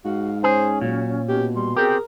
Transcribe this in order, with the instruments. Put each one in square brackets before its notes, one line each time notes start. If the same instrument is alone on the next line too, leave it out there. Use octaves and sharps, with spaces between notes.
[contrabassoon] G#2 [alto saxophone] F#4 [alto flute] F5
[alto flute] C#4 [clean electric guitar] G#4 [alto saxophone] C5
[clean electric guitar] A#2 [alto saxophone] F#3
[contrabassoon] B2 [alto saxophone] G4
[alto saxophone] G3 [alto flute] C6
[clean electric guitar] C4 G4 [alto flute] G#4 [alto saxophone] A#4